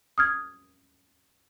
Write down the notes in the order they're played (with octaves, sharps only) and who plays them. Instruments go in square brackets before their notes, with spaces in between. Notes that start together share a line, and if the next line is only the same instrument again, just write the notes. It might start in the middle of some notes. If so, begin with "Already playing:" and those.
[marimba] D#6 F6 G#6